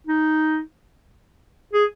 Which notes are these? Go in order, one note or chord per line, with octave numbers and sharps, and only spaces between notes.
D#4
G#4